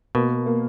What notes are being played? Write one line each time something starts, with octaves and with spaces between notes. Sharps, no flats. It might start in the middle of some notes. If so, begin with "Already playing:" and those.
B2 A#3
A#3